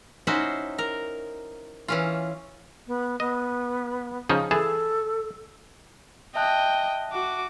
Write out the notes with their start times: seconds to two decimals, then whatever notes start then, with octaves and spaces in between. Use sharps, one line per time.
0.27 C#4 D#4 E4 F#4 C5
0.78 A#4
1.88 E3 C#4 F4
2.87 B3
3.20 B3 D#5
4.29 C#3 F3 D#4
4.51 E3 G#4 A4 A5
6.35 D#5 E5 G5 A5 F#6
7.13 F#4 D6